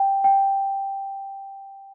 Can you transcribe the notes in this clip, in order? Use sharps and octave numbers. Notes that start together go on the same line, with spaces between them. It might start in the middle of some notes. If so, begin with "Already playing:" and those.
Already playing: G5
G5